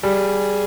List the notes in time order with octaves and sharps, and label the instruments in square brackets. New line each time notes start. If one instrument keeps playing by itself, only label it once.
[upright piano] G3 [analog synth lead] G#4